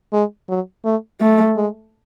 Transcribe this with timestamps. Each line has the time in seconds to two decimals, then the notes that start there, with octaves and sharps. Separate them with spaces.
0.13 G#3
0.49 F#3
0.85 A3
1.21 A3
1.56 G#3